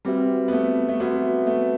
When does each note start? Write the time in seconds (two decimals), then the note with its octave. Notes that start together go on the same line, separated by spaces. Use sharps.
0.05 G3 C4 F#4 B4 E5
0.48 B3
0.53 A3
0.89 A3
1.00 B3 C4 F#4 B4 E5
1.47 A3